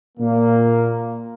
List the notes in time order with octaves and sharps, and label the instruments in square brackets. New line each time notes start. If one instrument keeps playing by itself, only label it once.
[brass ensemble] A#2 A#3